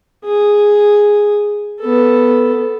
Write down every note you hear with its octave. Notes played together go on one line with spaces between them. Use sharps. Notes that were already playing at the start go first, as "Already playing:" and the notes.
G#4
B3 A4